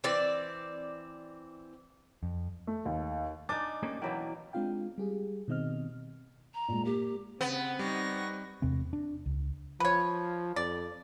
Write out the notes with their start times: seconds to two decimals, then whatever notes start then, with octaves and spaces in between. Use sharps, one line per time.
0.04 E3 C4 D5
2.23 F2
2.67 A3
2.85 D#2
3.49 D4 D#4 G#5 D6 A6
3.83 A#3 C#4 G4
4.02 B2 E3 F#3 A#3 E4 G5
4.53 G#3 C4 D4 F4 F5 G5
4.98 G3 G4 G#4
5.48 B2 D#3 C4 D#5 F6
6.54 A#5
6.68 A#2 G#3
6.85 A#3 G4
7.41 C#3 B3 C4
7.79 G3 D#4 C#6 A#6
8.62 E2 C3 C4
8.93 D4
9.26 C#2
9.80 F3 B4 C#5
10.56 F2 D5